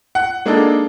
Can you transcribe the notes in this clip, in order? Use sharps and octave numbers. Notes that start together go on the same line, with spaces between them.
F#5
G#3 A#3 D4 D#4 A4